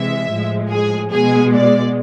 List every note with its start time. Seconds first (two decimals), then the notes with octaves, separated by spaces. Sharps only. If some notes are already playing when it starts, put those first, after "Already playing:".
Already playing: C3 E3 G#3 E5
0.30 A2 F3 G#3
0.71 G#4
1.12 B2 G#3 G#4
1.53 D5